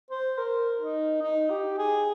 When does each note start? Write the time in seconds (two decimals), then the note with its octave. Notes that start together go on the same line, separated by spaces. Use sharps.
0.10 C5
0.38 A#4
0.81 D#4
1.22 D#4
1.50 G4
1.78 G#4